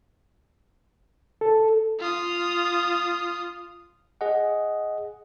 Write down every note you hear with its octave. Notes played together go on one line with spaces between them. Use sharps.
A4
F4 D#6
G#4 D#5 F#5